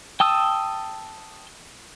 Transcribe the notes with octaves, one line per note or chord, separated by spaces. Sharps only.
G5 A5 D#6 E6